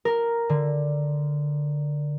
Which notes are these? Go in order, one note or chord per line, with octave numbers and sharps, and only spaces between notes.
A#4
D3